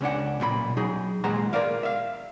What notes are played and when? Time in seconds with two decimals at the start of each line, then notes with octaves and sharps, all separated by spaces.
0.01 C#2 C#4 D4 F#5
0.40 B1 A#2 G#4 B5
0.77 F#3 D#4 G#4
1.24 D#2 A#2 G#3 C5 F#5 A#5
1.53 A#4 C5 D5 F5
1.83 E5 F5